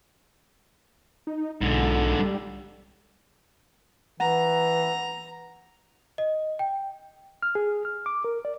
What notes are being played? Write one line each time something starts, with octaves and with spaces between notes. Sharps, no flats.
D#4
B1 G#2 D3
G3
E3 F#5 A#5
D#5
G5
F6
G#4
F6
D6
A#4
D5